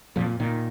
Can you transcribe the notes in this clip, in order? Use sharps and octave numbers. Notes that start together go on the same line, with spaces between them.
F2 A#2 F3
A#2 D#3